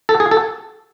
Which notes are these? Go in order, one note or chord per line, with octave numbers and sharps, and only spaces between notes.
A4
G#4
A4